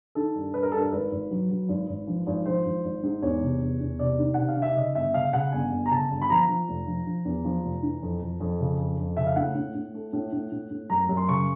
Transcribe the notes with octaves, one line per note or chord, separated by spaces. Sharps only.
D#3 A4
G2
G2 B4
A#4
G2 A4
A#4
G#1 B4
G#1
F#3
F#3
G#1
G#1
F3
G#1
F3 C5
G#1
G#1
G#2
E2 C#5
C3
E2
E2
C3 D5
D#3
C3 F#5
F5
D#3
E5
C#3 D#5
G1 E5
C#3 F5
C#3 F#5
G1 G#5
G1
A#5
C#3 A5
G1
B5
F3 A#5
F3
F1
F3
F3
E2
F3
F1
E3
F2
F2
F2
C#3
F2
F2
C#3 E5
F5
A2 F#5
A2
A2
A3
A2
A2
A2
A2
F#2 A#5
F#2
C6
C#3 C#6